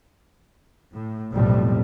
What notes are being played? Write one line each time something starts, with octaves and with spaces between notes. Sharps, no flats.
A2
B1 F2 A2 C3 G3